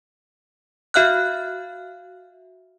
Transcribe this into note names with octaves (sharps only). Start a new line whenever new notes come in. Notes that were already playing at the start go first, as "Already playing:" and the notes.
F#4 E5 F5 F6 F#6